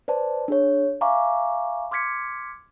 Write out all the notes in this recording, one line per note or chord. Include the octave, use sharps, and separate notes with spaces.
B4 C5 D5 A5
D4 G#4 C#5
E5 F5 G#5 A#5 C#6 D6
C6 D6 F6 G#6 B6 C#7